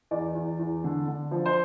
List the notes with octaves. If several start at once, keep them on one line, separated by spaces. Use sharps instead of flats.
E2 D5
E2
E2
D3
D3
F3
C5